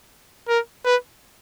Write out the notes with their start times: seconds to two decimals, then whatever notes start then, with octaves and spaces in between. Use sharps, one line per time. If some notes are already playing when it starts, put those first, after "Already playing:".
0.48 A#4
0.85 B4